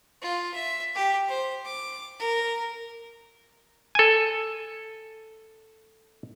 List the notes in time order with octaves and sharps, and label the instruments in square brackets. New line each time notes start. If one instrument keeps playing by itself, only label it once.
[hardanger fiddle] F4
E5
G4
C5
D6
A#4
[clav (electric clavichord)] A4 G#5